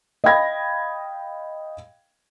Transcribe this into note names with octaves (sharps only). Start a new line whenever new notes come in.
D#5 F5 G5 B5 G#6 A#6